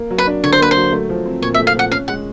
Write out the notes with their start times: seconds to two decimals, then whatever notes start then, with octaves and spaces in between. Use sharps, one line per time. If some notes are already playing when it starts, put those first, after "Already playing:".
Already playing: A#3
0.10 F#3
0.18 B4
0.27 D4
0.43 D3 C#5
0.52 C5
0.60 A#3 B4
0.71 C5
0.76 F#3
0.92 A3
1.09 F3
1.25 C4
1.42 A#2 C#5
1.54 E5
1.59 A3
1.67 F5
1.75 F3 F#5
1.91 C#4 F5
2.08 G#3 F#5